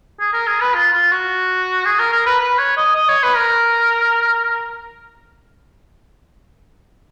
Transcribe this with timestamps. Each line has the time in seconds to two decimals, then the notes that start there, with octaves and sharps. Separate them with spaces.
0.20 G#4
0.33 A#4
0.47 G#4
0.61 B4
0.74 F4
0.93 F4
1.12 F#4
1.85 G#4
1.99 A#4
2.12 A#4
2.26 B4
2.40 B4
2.58 C#5
2.77 D#5
2.95 D#5
3.09 C#5
3.23 B4
3.37 A#4